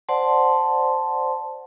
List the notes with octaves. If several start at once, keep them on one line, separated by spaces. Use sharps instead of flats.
C5 D5 F#5 A5 C6